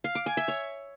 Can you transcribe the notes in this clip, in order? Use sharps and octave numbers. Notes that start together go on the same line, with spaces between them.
F5
D6
G#5
E5
C#5